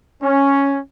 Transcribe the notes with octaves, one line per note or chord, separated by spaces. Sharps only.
C#4